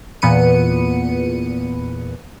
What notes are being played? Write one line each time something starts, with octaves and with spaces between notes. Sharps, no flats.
E2 A#2 B3 B4 C#7 D#7